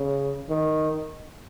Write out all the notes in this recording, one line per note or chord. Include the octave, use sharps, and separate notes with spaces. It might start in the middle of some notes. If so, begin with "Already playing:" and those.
Already playing: C#3
D#3